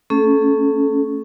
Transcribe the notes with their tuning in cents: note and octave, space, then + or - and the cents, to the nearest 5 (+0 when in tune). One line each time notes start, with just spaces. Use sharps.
A3 +35 C#4 +0 A4 -25